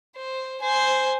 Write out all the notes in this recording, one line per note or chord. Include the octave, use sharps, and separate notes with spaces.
C5
C5 G#5